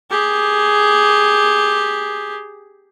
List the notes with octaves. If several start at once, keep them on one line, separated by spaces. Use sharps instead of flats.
G4 G#4